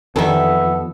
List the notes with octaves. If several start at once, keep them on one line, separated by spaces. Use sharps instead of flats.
F2 D#3 E3 G3 B3 A4 E5